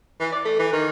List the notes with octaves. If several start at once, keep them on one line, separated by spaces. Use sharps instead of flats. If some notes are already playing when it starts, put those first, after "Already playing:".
E3
D5
A3
E3
D#3